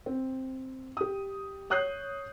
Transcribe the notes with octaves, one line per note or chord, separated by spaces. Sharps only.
C4
G4 D#6
C#5 D#6 F#6 G6 C7